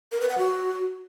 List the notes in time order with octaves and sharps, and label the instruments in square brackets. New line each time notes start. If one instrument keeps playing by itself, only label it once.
[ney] A#4
B4
F#5
F#4